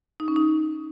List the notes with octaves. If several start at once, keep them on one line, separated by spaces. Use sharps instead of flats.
D#4
C#4
D#4